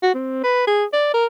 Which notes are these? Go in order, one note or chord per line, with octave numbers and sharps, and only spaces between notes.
F#4
C4
B4
G#4
D5
A#4